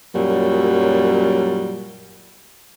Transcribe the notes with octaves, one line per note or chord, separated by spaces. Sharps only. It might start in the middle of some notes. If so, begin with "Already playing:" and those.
F#2 A#2 F#3 G3